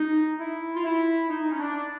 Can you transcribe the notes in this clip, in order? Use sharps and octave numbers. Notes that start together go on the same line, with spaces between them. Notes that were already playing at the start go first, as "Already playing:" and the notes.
Already playing: D#4
E4
F4
E4
D#4
C#4
D4